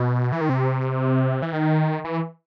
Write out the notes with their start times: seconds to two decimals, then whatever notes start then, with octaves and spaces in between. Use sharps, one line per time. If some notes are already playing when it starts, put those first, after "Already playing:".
Already playing: B2
0.32 E3
0.41 D#3
0.49 C3
1.42 E3
1.53 D#3
2.05 E3